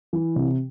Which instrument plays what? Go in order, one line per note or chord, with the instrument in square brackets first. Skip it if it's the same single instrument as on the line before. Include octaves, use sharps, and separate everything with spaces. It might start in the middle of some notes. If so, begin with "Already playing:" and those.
[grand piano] E3
C3